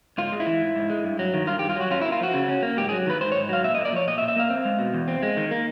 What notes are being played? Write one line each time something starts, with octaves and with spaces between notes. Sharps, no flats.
G#2 F4
G#3
E4
E3
G#2
G#2
G#3
G2
F#3
D#3
G2 F4
G4
G2
F4
F#3 F#4
C#4 F4
E4
A#3
F4
F3 F#4
C#3
C#4
A#3
G#2 G4
G#4
F#3
D#3 B4
G#2 C5
C#5
G#2
F#3 F5
A#2 E5
D#5
A#3
D5
F3 C#5
A#2 D#5
E5
A#2
E5
A#3 F5
C4
G#3
B2
E2
C4
G#3
D#3
A#3